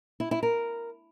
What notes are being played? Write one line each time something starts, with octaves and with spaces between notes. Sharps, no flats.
E4
E4
A#4